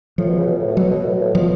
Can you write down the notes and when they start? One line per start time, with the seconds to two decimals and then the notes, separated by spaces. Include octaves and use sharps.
0.18 A2 F3
0.27 B2
0.38 C#3
0.47 B2
0.57 A2
0.67 A2
0.76 B2 F#3
0.91 B2
1.05 A2
1.14 B2
1.22 A2
1.35 B2 F3